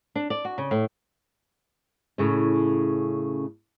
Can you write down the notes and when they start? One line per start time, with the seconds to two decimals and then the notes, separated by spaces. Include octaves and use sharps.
0.15 D4
0.30 D5
0.45 F#4
0.58 C#3
0.71 A2
2.18 A2 C#3 C#4